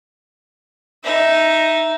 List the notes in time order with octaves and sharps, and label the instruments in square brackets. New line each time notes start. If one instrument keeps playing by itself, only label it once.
[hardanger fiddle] D#4 [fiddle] E5